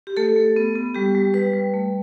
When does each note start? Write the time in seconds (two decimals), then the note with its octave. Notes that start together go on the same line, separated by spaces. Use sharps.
0.07 G4
0.17 A3 A4
0.36 A3
0.56 B3
0.75 B3
0.94 G3 G4
1.15 G3
1.34 G3 B4
1.53 G3
1.73 A3